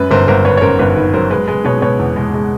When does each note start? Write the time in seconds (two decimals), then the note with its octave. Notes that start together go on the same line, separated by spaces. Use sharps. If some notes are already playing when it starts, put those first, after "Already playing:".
Already playing: F#2 B4
0.11 G1 A#4 C5
0.28 G1 A#4 C5
0.45 G1 B4 C#5
0.57 C#5
0.62 F#2 A#4 C5
0.79 G1 B4
0.97 D#3 B4
1.14 F#3 A#4 C5
1.30 G#3 B4
1.48 G#3 B4
1.65 B2 B4 C#5
1.82 B2 B4 C#5
1.99 E2
2.16 G#3
2.34 G#3